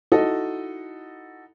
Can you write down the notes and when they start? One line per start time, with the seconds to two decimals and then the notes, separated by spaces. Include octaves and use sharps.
0.12 D#4 E4 F#4 A4 D#5